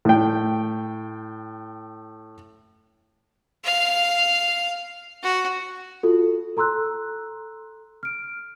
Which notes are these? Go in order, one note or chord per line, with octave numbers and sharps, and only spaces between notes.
A2 G5
F5
F#4
F4 F#4 A4
A4 A#5 C6 E6 F#6
F6 D7